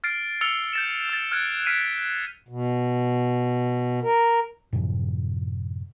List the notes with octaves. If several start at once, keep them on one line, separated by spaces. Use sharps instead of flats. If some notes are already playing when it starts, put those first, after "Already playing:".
F6 A6 C7 D7
E6 F6 A6 C#7 F7 G7
G6 A6 E7
E6 A6
F6 F#6 G#6 D7
F6 B6 C7 D7 D#7
B2
A#4
F#2 A2 C3 F3